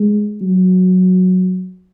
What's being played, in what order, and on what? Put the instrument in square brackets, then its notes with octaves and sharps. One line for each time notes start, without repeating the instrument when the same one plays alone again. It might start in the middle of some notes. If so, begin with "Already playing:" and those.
Already playing: [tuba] G#3
F#3